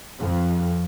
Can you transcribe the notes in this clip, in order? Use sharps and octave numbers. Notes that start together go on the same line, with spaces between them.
F2